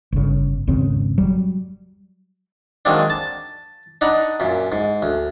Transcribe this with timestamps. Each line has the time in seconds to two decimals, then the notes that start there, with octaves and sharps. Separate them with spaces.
0.12 G1 C#3
0.67 G#1 E2 C#3 C4
1.18 F#3 G3
2.85 D#3 F#3 G#3 A#3 C4 D4
3.10 A5
4.01 D4 D#4 F#5 A#5 B5
4.40 F#2 A#2
4.72 G#2
5.02 D2